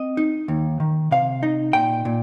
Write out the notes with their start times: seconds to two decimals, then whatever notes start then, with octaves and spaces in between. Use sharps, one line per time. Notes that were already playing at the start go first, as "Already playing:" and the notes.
Already playing: C4 D#5
0.17 D#4
0.48 D#2
0.80 D#3
1.11 C3 F5
1.43 D#4
1.73 A#2 G5
2.05 A#2